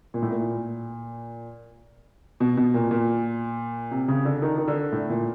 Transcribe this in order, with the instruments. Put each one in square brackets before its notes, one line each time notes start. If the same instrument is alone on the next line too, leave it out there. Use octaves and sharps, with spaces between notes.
[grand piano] A#2
A2
A#2
B2
B2
A#2
A#2
C3
C#3
D3
D#3
D#3
D3
A2
A#2